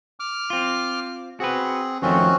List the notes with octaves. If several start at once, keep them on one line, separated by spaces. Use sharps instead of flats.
D6 F6
C4 F4
C4 F#4 G#4 B4
F2 D#3 A3 C4 C#4 F#4